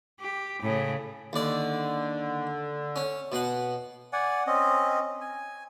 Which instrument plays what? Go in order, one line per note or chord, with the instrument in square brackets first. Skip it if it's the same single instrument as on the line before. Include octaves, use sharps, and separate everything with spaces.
[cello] G4
A2 C#3
[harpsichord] D#2 D5 [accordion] D3
[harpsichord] C#4
B2 F#5
[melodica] D5 F#5 G#5
C4 C#4 D#5
G#5